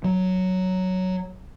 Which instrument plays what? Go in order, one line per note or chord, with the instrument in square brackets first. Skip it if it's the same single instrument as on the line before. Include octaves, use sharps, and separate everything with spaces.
[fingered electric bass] F#3